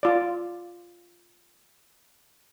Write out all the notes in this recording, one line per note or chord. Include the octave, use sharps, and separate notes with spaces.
F4 D5